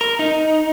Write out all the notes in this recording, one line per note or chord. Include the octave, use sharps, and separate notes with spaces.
A#4
D#4